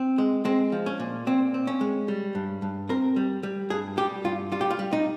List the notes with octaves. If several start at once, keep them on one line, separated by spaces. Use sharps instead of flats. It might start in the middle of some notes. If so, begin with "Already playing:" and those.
Already playing: C4
G#3
G#3 C4
F3
C#4
A#2
A#2 C4
C4
C#4
G#3
G3
G2
G2
C4 A#4
G3
G3
G2 G#4
G3 G4
G2 F4
G3 F4
G4
F4
G3
D#4